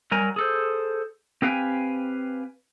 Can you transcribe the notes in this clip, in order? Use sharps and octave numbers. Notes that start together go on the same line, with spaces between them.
F#3 G3 A#4 G#5 A#5
G#4 A4 C5
C4 G4 B4 F5 G5 G#5